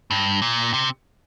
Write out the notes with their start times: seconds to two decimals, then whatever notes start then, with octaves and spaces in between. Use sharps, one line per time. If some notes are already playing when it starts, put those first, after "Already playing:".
0.11 G2
0.42 A#2
0.74 C3